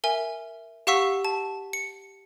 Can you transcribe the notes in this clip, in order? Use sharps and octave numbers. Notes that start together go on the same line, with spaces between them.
A#4 E5 G#5
G4 F5 F#5 C#6 E6 B6
A5
C#7